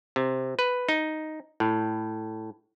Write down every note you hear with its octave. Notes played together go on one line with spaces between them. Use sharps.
C3
B4
D#4
A2